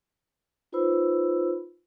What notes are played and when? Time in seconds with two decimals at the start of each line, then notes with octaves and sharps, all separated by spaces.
0.72 D#4 F4 B4 C5 B5 E6